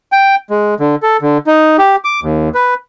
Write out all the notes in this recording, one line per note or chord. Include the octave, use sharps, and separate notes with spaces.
G5
G#3
D3
A4
D3
D#4
G4
D6
D#2
B4